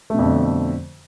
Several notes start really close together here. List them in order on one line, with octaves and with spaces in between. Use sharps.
A3 B2 F2 D3